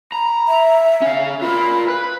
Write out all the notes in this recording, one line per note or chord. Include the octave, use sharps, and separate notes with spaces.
A#5 B5
E5
C#4 F5
F4 A#4 B5
B4